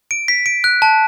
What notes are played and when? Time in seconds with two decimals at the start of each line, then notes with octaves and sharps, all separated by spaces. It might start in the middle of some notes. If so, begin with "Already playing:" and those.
0.11 D7
0.28 B6
0.46 D7
0.64 F#6
0.82 A5